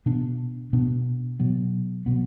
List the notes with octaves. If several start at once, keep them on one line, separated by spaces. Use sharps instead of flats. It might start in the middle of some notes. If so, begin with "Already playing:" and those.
B2 B3 D4
B2 B3 D4
B2 F#3 B3
B2 F#3 B3